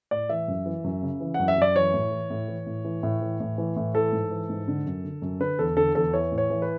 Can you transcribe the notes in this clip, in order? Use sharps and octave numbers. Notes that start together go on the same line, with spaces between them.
A2 D5
E3 E5
F#2
E3
F#2
C#3
E3
F#2 F#5
E5
F#2 D5
E3 C#5
A2
E3
A2
E3
A2
E3
A2
E3
A2
E3
A2
E3 A4
G#2
E3
G#2
D3
F#2
D3
F#2
D3 B4
E2 A4
D3 A4
E2 A4
E3 C#5
A2
C#5
E3
B4